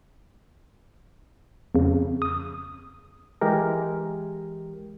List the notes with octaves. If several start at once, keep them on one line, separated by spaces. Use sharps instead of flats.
F2 C#3
D#6
E3 G#3 G4 A#4